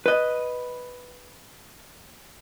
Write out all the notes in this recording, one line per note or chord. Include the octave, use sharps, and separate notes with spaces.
B4 D#5